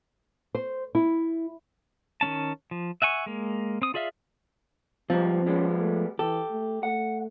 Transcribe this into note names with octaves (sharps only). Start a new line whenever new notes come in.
C5
E4
D#3 A3 C#4 A5
F3
E5 F#5 G#5 C#6
G#3 A#3
C4 D#6
F4 G#4 D5 E5 F5
G#2 C3 F3 G3 C4
G3 G#3 B3 C#4
A3
E3 G4 A4
A3
A3 F#5